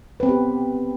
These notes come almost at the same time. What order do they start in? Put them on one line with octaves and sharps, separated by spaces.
B4 C4 B3 G4